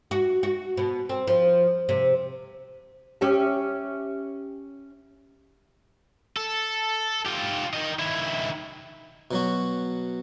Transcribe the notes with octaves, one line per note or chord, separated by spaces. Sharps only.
F#4
F#4
B2
C4
F3
C3
C#4 G4 E5
A4
F4 G4
D#3 D#5
D#3 E4
B2 F#3 F#4